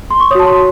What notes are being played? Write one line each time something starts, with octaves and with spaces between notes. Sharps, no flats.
C6
C#6
F#4 C#5 A5 D#6
C6